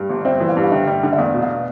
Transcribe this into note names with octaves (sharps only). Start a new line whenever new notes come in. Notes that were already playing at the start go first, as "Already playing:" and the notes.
Already playing: G2
G1
D5
C4 C5 E5
E3
D5 F5
G2
F5
D3 E5 G5
G3
D3
E5
E2 D5 F5
B2
D5 F5